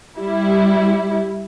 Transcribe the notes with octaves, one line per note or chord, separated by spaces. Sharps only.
G3 E4